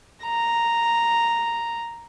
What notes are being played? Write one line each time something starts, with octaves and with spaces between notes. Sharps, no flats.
A#5